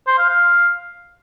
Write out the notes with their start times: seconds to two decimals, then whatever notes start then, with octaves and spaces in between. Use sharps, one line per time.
0.07 C5
0.18 F5
0.29 F5